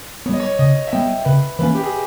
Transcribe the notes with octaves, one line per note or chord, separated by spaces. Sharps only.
G3 B3 C#5 D#5
C#5
C#3 D#5
E5
G3 B3 G5
C#3 B4
E3 A#3 C#4 B4
G4
G#4